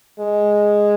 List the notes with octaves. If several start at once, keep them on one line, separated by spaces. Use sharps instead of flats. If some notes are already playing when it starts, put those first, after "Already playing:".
G#3